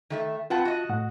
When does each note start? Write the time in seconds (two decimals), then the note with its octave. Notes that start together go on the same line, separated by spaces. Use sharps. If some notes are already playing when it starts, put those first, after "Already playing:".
0.10 D#3 A3 E5
0.50 C4 F4 B4 F#5 A5
0.65 F#4 D#5
0.89 A2 F#5